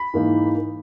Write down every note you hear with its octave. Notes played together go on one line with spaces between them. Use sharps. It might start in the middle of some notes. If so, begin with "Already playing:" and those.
Already playing: B5
G#2 E3 A#3 D#4